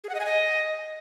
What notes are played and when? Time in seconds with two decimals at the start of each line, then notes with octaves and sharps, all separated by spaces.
0.04 G#4
0.09 F#5
0.15 D#5
0.20 G#5
0.25 D#5